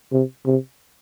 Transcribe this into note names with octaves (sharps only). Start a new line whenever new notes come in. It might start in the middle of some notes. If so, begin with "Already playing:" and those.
C3
C3